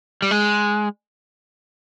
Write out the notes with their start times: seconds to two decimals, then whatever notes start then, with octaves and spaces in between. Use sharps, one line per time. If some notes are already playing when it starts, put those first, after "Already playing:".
0.22 G3
0.31 G#3